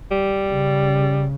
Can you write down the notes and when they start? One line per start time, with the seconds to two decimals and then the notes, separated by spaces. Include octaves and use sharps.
0.11 G3
0.48 C#3